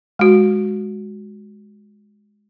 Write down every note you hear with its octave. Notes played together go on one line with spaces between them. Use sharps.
G#3 F#4